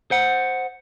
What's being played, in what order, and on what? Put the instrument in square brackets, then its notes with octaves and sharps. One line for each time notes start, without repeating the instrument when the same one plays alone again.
[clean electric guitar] C5 F#5